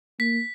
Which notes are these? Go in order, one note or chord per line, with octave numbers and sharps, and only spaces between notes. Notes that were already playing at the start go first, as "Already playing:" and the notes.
A#3 B6